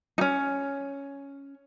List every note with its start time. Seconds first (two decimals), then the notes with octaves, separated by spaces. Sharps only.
0.18 C#4 D#4